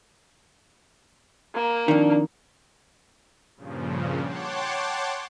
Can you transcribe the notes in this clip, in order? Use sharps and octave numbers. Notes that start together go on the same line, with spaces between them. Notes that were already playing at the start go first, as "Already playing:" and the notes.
A#3
F2 D#3 D4
G2 A#2 C#3 F3
C#5 F#5 G5 A5 C6 D6